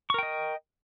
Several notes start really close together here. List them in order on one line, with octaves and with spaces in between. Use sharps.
C#6 A#4 G5 D#5